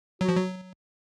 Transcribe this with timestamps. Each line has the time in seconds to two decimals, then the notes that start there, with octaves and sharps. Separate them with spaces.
0.21 F#3 F#4
0.29 F3
0.36 F#3